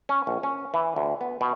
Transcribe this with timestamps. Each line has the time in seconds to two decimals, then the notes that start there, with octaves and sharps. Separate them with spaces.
0.09 C#4
0.27 A#1
0.43 C#4
0.74 E3
0.96 D2
1.21 B3
1.41 B2